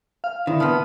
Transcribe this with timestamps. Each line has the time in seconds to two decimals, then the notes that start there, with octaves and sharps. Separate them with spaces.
0.24 F5
0.47 D3 D#3 E4
0.60 A#2 B3 A5 D#6 F6